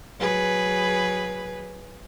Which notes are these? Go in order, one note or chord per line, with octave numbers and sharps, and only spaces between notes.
F#3 G#4 B4